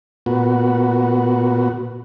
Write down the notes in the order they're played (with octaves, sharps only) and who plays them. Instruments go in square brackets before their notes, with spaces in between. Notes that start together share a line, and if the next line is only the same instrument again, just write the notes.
[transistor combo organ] A#2 B3 F#4